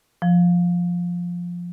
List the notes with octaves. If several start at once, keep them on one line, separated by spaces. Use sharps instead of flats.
F3